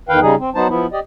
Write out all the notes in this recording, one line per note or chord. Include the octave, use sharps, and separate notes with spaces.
E2 D#3 B4 F5 G5
C#3 G3 D#4 G#4
C4
F#3 B3 D#4 C5 A5
F3 B3 E4
G4 D5 D#5